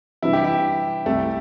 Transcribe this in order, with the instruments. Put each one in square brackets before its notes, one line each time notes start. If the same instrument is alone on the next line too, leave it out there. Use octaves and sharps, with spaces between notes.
[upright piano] C3 E3 G3 D4 [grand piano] E4
[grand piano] G4
E4
[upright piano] C2 C3 G3 [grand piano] A3